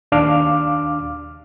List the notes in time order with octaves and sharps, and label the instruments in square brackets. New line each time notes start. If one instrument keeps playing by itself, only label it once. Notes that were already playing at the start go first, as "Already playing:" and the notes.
[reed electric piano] D#2 D4 F5 D6 F6